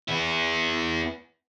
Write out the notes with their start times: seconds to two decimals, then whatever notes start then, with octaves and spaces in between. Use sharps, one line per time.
0.09 B3 E4